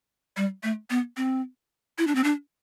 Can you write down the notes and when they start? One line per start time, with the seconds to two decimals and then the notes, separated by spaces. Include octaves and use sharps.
0.37 G3
0.63 A3
0.90 B3
1.17 C4
1.98 E4
2.07 D4
2.15 C4
2.24 D4